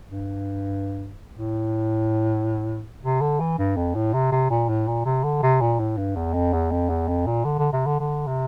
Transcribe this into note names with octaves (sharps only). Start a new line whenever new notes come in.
G2
A2
C3
D3
E3
G2
F2
A2
C3
C3
A#2
A2
A#2
C3
D3
C3
A#2
A2
G2
E2
F2
E2
F2
E2
F2
A#2
D3
D3
C3
D3
D3
C3